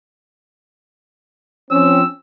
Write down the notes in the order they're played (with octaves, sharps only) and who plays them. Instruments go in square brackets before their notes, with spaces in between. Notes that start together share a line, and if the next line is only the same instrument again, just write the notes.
[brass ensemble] F3 C4 C#4 [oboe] E6